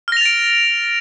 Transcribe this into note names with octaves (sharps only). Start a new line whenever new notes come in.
F6 A6 A#6 D7 F7